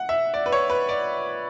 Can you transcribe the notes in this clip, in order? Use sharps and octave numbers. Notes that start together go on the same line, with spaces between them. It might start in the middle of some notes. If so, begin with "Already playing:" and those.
Already playing: F#5
E5
D5
B4
C#5
B4
D5